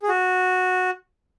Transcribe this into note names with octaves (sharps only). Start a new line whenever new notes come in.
G#4
F#4